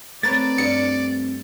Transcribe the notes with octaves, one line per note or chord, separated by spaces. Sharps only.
A3 C4 A#4 B4 C#5 D5 A6
G2 C#7